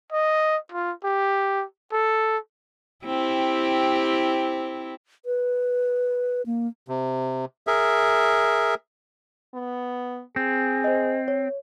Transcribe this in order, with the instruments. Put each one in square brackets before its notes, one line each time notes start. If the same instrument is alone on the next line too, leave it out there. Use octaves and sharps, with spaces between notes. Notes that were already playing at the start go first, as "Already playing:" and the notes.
[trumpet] D#5
F4
G4
A4
[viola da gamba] C4 E4 G4
[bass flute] B4
A#3
[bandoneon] C3
G#4 A#4 E5
[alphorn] B3
[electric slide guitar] C4 [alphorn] G#4
[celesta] C5 D#5
C#5